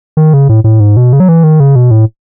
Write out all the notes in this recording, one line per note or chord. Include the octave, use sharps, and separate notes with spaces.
D#3
C#3
A2
A2
G#2
B2
C#3
F#3
E3
D#3
C#3
B2
A2